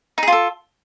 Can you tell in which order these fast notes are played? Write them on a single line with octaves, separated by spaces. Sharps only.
D#4 G#4 F4 A4